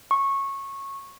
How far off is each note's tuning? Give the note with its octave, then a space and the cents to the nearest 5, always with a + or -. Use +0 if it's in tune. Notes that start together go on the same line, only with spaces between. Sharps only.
C#6 -15